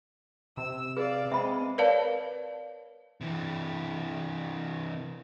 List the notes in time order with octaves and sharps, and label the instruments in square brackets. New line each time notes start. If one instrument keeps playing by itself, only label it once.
[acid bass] C3 [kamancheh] E6
[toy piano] G#4 B4 [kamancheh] D5 F5
[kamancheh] G#3 [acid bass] C4 [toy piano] E5 B5 D6
[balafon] A#4 B4 C#5 D5 F5 A5
[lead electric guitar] C3 E3